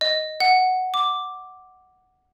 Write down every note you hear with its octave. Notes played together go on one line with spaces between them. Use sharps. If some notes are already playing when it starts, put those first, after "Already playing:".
D#5
F#5
D6